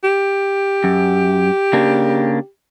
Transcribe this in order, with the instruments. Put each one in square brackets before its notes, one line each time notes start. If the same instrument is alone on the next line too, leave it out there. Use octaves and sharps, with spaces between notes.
[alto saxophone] G4
[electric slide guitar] F#2
C#3 A#3 D4